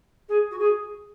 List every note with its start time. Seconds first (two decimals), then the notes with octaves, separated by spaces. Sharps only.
0.29 G#4
0.51 F#4
0.59 G#4